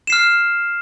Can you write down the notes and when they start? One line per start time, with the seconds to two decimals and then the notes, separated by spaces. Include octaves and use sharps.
0.07 E7
0.10 C7
0.12 F6